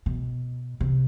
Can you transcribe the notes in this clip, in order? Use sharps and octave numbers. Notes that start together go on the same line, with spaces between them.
B2
C3